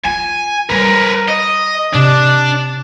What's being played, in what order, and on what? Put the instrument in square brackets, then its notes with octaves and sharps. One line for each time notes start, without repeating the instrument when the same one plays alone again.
[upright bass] F4 [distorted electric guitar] G#5
[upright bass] G3 [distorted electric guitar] A#4 B4
[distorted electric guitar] D#5
[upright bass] C3 [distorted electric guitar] D4